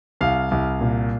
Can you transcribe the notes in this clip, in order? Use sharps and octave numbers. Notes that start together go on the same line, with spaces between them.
C2 F5
C2
A#2